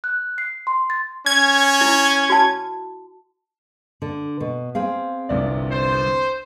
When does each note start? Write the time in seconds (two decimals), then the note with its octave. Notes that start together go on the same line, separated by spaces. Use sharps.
0.04 F#6
0.38 C7
0.67 C6
0.90 A6
1.26 C#4 G#6
1.81 E4
2.30 F#4 A5
4.02 D3
4.40 B2
4.75 C4 G#4 F5
5.29 G1 C2 D5
5.71 C5